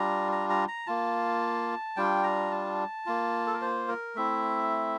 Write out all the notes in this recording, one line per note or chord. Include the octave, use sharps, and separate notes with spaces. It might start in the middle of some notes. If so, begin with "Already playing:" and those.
Already playing: G3 D4 F4 A#5
A#5
A#5
A#5
A#3 F4 A5
G3 D4 F4 G5
A#5
A5
A#3 F4
A4
A#4
C5
A#4
A3 C4 E4 E5